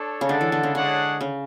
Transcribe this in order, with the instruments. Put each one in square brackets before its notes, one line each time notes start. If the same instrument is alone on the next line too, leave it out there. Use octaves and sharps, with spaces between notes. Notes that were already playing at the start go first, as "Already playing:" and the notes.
Already playing: [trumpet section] D4 A4 C#5
[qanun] C#3
[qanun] D3 [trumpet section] G#3 D4 A4
[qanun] E3
D3
C#3
[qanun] D3 [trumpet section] G#3 D4 G#4 C#5 F#5
[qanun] C#3